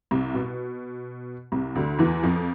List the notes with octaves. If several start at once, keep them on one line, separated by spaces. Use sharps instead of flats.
C2 C3
B2
C2 C3
D2 D3
E2 E3
F2 F3